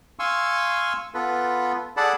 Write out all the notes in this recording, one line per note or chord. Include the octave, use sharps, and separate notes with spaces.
F5 G#5 C6 C#6 E6
B3 F4 A4 B4
G#4 A4 D5 F#5 A5 B5